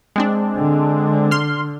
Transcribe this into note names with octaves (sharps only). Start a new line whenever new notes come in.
G#3 C4 D4
D3
C6 F6